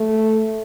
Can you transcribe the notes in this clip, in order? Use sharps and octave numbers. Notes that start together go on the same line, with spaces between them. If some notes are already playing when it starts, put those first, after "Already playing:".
Already playing: A3